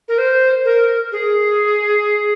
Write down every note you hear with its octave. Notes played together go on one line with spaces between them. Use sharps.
A#4
C5
A#4
G#4